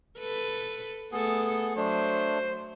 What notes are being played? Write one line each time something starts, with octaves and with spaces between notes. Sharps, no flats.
A4 B4
A3 B3 G#4 A4
F#3 A3 D4 C5